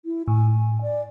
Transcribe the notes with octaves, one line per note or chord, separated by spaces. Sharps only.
E4
A2 G#5
D5